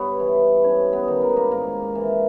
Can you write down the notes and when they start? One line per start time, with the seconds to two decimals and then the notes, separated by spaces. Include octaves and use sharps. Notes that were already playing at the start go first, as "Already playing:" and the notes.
Already playing: G2 B3 B4 C#5
0.20 E3
0.64 G2 C#4 C#5
0.93 B3 B4
1.08 D#3
1.22 A#4
1.29 B4
1.37 A#3 A#4
1.51 G#2 A#3 A#4
1.95 E3